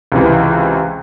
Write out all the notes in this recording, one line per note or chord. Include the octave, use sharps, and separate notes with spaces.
C#2 C3 E3